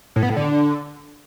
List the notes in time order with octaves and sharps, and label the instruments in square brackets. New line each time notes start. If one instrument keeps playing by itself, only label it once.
[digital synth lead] A2
B3
A2
D3